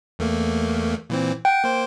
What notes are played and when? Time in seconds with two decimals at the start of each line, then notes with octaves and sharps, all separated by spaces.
0.19 E2 A3 A#3
1.10 A#2 E3 C4
1.45 F#5 G5
1.64 A#3 C5